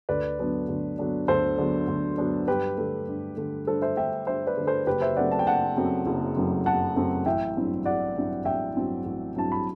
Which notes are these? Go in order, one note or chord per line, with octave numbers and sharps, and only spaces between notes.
D2 B4 D5
D3 F#3 B3 D4
D2
D3 F#3 B3 D4
D2 A4 C5
D3 F#3 B3 D4
D2
D3 F#3 B3 D4
G2 G4 B4
D3 A3
G2
D3 A3
G2 A4 C5
C5 E5
D3 A3 E5 G5
G2 C5 E5
B4 D5
D3 A3
A4 C5
F#1 G4 B4
C5 E5
F#2 F#3 A3 C4 D5 F#5
A5
G5
F#1 F#5 A5
F#2 F#3 A3 C4
F#1
F#2 F#3 A3 C4
F#1 F#5 A5
F#2 F#3 A3 C4
A1 E5 G5
G2 F#3 C4 E4
A1 D5 F#5
G2 F#3 C4 E4
A1 E5 G5
G2 F#3 C4 E4
A1
G2 F#3 C4 E4 A5
B5